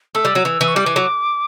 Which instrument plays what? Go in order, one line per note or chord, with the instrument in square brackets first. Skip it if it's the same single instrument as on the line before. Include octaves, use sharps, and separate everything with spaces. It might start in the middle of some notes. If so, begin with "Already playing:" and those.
[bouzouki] A3 [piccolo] E6
[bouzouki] G3
F#3
E3
E3
[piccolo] C#6
[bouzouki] G3 [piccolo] D6
[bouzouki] E3
F#3